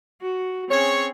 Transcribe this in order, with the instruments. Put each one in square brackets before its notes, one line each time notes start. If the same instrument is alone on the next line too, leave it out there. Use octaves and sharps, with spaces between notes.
[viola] F#4
[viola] C4 C#4 [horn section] G#4 C#5